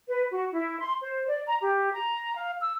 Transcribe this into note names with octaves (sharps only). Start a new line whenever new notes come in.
B4
F#4
E4
C6
C5
D5
A#5
G4
A#5
F5
E6